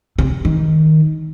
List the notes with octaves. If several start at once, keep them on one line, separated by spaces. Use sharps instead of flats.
C3
D#3